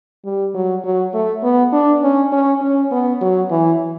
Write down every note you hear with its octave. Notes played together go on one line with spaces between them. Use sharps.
G3
F#3
F#3
A3
B3
D4
C#4
C#4
C#4
B3
F#3
E3